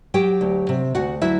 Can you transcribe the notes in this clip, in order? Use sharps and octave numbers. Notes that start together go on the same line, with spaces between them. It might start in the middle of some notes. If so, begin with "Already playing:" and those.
F#3 G4 G5
D2
C3
D2 F#4 F#5
F#3 E4 E5